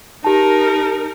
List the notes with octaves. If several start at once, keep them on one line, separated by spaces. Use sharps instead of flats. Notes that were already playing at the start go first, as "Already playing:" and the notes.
D#4 G4 A#4 A5